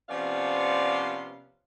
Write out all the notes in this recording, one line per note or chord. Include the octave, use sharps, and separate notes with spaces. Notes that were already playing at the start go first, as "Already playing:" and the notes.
C3 F3 B3 C#4 D5 F5